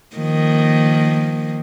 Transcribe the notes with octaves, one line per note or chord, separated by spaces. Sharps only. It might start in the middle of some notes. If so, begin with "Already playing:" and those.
D#3 F3 A#3